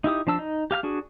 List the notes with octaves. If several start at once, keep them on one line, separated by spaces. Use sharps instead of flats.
D#4 E4 G4 D#6
F3 D4 A5 E6
D#4
G4 F5 G#5 F6
D4 F#4 G#4